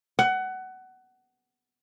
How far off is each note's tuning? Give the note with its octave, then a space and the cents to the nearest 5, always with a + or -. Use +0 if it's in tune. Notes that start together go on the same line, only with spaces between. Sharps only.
F#5 +20